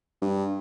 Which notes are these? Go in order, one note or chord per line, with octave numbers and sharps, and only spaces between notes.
G2